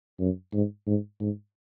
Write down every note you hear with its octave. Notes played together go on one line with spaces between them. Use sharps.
F#2
G#2
G#2
G#2